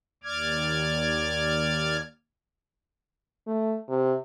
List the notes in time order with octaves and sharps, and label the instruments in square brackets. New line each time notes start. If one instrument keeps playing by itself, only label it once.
[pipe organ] D#2 D5 D6 F6 G#6
[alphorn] A3
C3